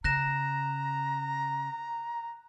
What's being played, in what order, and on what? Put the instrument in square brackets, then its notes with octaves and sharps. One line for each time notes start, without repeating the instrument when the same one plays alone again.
[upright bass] C#3 [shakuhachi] A#5 [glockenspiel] F#6 A#6 E7